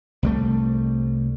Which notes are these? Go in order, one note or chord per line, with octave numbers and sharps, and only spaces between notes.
C2 G3 A3